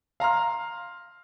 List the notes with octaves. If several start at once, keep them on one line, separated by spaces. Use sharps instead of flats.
F5 A#5 C6 F6